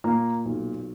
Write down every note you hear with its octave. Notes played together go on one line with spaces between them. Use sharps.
A#2 A#3
B1